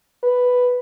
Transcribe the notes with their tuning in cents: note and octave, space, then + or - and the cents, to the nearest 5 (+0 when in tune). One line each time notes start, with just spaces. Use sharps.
B4 +0